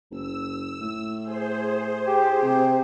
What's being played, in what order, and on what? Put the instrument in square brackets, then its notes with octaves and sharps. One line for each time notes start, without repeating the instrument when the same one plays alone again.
[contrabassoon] F#1 [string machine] E6
[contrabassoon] A2
[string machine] G#4 C5
[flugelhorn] G4
[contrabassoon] C3 [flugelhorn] G4